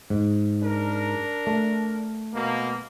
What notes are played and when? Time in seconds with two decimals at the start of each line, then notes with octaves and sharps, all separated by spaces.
0.10 G#2
0.62 D4 A#4
1.47 A3
2.34 B2 A#3